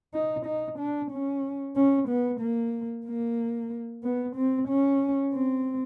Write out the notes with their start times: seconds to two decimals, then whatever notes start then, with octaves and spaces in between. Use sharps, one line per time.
0.14 D#4
0.46 D#4
0.79 D4
1.11 C#4
1.76 C#4
2.09 B3
2.41 A#3
3.06 A#3
4.04 B3
4.36 C4
4.69 C#4
5.33 C4